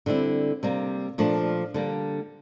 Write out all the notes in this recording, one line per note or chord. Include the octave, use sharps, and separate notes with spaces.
D3 G3 C4 E4
C3 G3 A#3
A#2 F3 A3 D4
D3 G3 A#3